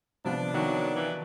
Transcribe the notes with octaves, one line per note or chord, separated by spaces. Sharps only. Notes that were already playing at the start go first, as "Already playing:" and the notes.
C3 F3 B3 D4
D#3 F#3
E3